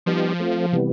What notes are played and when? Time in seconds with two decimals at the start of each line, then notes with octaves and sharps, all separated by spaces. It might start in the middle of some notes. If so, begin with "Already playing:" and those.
0.06 F3 G3 B3 D#4 G4
0.40 A3 C4 F4
0.72 C3 E3 G3 B3